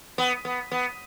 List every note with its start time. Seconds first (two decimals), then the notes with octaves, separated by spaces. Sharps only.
0.18 B3
0.45 B3
0.72 B3